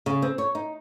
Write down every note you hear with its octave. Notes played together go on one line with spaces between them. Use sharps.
C#3
C4
C#5
D#4